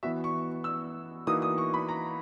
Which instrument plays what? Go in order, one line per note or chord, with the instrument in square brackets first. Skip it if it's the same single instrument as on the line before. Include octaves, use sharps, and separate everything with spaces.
[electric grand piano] E3 B3 F#4 [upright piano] E5
[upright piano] C#6
E6
[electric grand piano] E3 A#3 D#4 F#4 [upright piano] D#6
[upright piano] D#6
C#6
B5
A#5